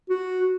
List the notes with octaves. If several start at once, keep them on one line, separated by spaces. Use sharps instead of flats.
F#4